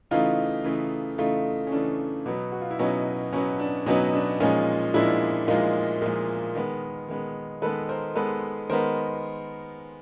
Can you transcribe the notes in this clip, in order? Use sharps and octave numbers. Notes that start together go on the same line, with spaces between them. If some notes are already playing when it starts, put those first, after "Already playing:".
C#3 E3 A3 D#4 F4
C#3 E3 A3
C#3 E3 A3 D#4 F4
C#4
C#3 E3 A3 D4
B2 F#3 B3
F#4
F4
E4
B2 F#3 B3 C#4 D#4
B2 F#3 B3 C#4
D4
B2 F#3 B3 C#4 D#4
D4
A#2 F3 G#3 C#4 D#4
A#2 F3 G#3 D4 E4
A#2 F3 G#3 D#4 F4
A#2 F3 G#3
D#3 G#3 B3
D#3 G#3 B3
D#3 G#3 B3 A4 B4
A#4 C5
D#3 G#3 B3 A4 B4
D#3 G#3 B3 A#4 C5